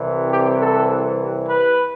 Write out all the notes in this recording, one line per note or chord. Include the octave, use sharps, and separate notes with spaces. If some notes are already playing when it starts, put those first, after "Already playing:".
Already playing: C2 C3 E3 G3
G4
A4
B4